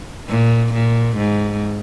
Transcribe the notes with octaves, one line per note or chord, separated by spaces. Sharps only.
A#2
A#2
G#2